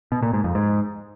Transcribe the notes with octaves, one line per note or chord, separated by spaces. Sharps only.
B2
A#2
G#2
F2
G#2